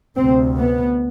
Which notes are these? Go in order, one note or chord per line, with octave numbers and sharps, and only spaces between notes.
D2 C3 C4
B3